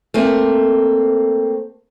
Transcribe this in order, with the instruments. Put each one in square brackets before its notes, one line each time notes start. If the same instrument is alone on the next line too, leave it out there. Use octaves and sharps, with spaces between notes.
[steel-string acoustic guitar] A3 A#3 C4